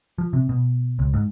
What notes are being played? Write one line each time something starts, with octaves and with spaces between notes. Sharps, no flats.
F3
C3
B2
C#2
G#2